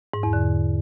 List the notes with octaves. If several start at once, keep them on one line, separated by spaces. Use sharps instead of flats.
G#2
E2
D3